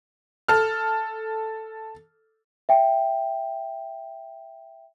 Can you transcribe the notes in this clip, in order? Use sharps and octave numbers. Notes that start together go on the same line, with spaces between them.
A4 F6
E5 G5